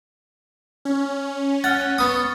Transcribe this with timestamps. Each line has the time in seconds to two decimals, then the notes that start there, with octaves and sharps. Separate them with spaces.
0.85 C#4
1.64 F#5 F6 A6
1.98 B3 C#6 D#6